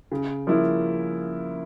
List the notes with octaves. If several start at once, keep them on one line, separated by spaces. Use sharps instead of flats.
C#3
F3 A#3 C#4 E4